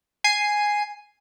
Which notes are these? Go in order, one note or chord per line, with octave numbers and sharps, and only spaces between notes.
G#5 C7 D#7